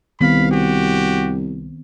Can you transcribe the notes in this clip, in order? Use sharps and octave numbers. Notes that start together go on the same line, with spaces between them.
C2 D#3 B3 C4 F5 B5
F#4 G4